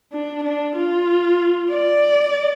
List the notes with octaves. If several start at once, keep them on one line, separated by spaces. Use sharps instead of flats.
D4
D4
F4
D5